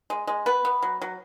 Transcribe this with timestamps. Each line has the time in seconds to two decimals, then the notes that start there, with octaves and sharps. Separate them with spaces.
0.10 G#3
0.27 G#3
0.46 B3 B4
0.65 B3
0.82 F#3
1.02 F#3